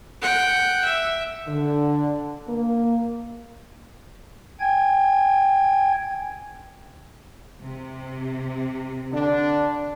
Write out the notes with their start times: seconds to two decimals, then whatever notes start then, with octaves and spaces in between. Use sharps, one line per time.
0.22 F#5 G5
0.85 E5
1.48 D3
2.48 A#3
4.60 G5 G#5 G#6
7.62 C3
9.12 D3 D4